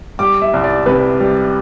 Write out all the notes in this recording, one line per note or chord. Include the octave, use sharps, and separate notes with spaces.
G3 D6
E5
C2
D5
C3 B4
G3